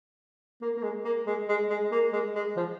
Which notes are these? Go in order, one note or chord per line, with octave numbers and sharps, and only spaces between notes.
A#3
A#3
G#3
A#3
G#3
G#3
G#3
A#3
G#3
G#3
F3